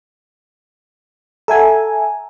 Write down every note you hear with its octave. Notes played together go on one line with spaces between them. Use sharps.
A4 E5 F#5 G#5 A#5